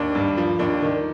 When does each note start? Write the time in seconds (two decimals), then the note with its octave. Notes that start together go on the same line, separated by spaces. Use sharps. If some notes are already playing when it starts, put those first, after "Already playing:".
Already playing: D#2 D4
0.15 G2
0.37 F3
0.59 D#2 D4
0.82 D#3